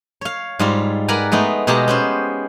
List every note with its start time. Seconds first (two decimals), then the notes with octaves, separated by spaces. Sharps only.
0.21 C#5 F5
0.59 G#2 G3 F4
1.08 A#4 B4 D5 F#5 G#5 A#5
1.32 G#3 A3 B3 D#4
1.67 B2 G#3 G4 G#4 A5 A#5
1.88 B3 C#4 C5